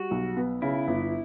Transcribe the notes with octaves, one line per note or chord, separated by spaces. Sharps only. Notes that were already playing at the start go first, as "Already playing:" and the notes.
Already playing: G3 F#4
B1
B3
C#3 E4
G1